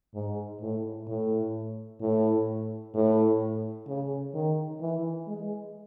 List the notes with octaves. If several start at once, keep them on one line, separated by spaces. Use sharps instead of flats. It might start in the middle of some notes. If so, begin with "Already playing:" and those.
G#2
A2
A2
A2
A2
C#3
D#3
E3
G#3